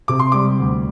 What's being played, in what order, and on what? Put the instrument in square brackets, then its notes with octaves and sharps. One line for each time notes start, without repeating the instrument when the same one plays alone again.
[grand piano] C3 D6
C6
G3 D6
D2